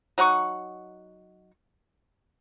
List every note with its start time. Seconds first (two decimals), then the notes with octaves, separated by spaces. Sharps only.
0.18 F#3 D#4 F#5 C#6